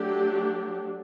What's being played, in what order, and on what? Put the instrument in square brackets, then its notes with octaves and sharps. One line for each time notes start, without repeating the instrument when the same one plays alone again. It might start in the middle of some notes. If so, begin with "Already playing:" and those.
Already playing: [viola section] F#3 A3 D4 G4